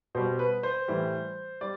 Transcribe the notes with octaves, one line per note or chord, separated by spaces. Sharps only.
B2 G3 C5
B4
C5
A2 E3 G3
G3 D5